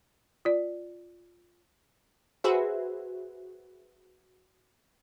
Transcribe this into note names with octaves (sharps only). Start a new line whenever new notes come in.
F4 D5
F#4 G#4 B4 C5 E5